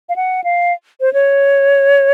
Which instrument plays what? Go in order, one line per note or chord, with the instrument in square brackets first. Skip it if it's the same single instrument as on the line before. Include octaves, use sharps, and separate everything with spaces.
[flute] F5
F#5
F5
C5
C#5